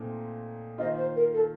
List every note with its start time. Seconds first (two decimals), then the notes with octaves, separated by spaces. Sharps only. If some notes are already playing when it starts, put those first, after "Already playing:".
Already playing: A#2 A3 C4 D#4
0.78 D#3 A#3 F4 C5 D#5
0.97 C5
1.15 A#4
1.33 A4